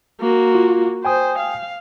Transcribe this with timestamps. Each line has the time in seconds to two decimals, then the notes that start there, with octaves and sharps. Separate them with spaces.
0.21 A#3 F#4
0.55 F4
1.05 C5 G5 G#5 D#6
1.39 F5